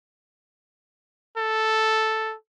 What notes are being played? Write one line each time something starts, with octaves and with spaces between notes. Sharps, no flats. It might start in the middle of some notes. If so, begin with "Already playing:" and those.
A4